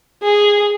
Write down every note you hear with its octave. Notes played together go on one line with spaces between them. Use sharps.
G#4